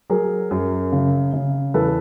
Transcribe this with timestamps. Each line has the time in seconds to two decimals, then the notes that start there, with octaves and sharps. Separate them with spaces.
0.10 F#3 G#4 A#4
0.51 F#2
0.92 C#3
1.33 C#3
1.74 E2 A4 B4